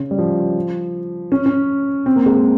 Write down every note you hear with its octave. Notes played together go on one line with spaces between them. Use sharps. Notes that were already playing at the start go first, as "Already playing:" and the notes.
Already playing: C#3
G3
F3
C#4
C#4
C4
A#3
G#3
A#3